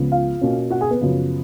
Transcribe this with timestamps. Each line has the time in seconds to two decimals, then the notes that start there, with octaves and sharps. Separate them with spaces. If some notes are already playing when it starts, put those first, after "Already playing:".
Already playing: C#2 C#3 F3 B3
0.12 F4 F5
0.41 B2 A#3 C#4
0.71 F#4 F#5
0.81 G#4 G#5
0.90 B3 B4
1.01 F#2 C#3 F3